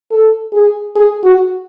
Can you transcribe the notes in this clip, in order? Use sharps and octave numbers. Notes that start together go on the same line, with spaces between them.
A4
G#4
G#4
F#4